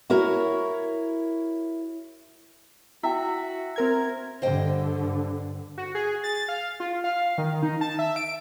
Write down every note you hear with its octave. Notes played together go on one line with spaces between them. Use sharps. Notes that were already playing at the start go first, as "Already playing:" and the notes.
E4 F#4 A#4 C#5
E4 F#4 E5 G5
C4 A#4 G#6
G2 D3 C5 D#5 G5
F#4
G#4
A6
F5
F4
F5
D#3
D#4
A5
E5
D7